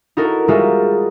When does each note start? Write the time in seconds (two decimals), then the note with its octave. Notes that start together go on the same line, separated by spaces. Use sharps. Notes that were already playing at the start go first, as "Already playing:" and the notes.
0.17 D#4 E4 F#4 A4 A#4
0.48 G3 G#3 D#4 F4 F#4 E5